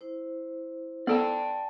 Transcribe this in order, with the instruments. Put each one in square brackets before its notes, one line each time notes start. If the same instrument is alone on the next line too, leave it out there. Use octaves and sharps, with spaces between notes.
[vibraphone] E4 C5
[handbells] B3 A4 [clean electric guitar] D5 G5 A5